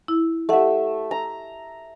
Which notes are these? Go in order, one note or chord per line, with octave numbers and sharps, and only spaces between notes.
E4
A3 G4 E5 F#5
A#5